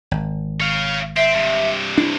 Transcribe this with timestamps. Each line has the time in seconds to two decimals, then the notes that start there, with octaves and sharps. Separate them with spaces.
0.11 G#1
0.60 C#5 F5
1.16 C4 E5
1.35 G2 C3
1.98 D4 E4